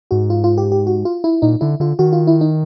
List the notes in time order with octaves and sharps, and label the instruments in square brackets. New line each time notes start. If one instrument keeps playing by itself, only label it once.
[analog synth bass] G#2 [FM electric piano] F#4
[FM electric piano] F4
F4
G4
G4
F#4
F4
E4
[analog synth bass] A#2 [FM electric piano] D#4
[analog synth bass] D3 [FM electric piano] E4
[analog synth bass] D3 [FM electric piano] F4
[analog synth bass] D#3 [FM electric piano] F#4
[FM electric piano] F4
E4
D#4